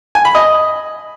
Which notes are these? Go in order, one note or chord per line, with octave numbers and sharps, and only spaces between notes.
G#5
B5
D#5